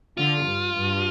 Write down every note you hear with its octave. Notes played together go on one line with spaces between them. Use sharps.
D3 F4
G2
G2